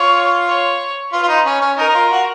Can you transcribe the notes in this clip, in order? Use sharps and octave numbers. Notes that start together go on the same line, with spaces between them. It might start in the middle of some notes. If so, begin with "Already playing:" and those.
Already playing: F4 C#5
C#5
F4 B4
F4
D#4
C#4
C#4
D#4 A#4
D#4
F4
F#4